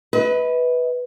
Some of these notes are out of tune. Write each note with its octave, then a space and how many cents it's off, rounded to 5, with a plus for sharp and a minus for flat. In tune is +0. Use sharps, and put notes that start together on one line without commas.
B4 +0 D#5 +45